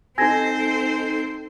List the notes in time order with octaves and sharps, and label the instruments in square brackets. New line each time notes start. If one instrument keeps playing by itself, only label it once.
[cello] C4 C5 [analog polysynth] D#4 A4 [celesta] G#5 G#6 A#6